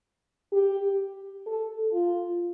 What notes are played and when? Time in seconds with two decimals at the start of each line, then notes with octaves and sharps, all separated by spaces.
0.53 G4
1.47 A4
1.93 F4